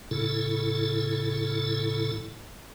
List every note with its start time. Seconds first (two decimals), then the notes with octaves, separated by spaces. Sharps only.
0.11 A2 C#3 E4 A4